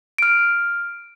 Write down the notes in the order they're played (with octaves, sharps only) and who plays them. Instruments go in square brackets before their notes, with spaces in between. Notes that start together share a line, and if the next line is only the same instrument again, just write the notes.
[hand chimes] F6 D7